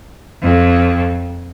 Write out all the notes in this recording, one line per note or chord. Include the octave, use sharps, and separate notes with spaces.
F2